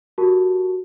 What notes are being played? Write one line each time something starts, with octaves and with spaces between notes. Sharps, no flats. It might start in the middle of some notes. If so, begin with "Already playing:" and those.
F#4 G4 A#4 A5 C#6